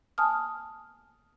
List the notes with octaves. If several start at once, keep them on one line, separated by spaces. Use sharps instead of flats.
G#5 A5 D#6 F6